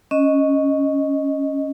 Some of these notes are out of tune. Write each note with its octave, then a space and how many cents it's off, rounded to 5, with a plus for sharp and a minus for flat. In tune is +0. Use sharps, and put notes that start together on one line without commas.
C#4 +0 D#5 +0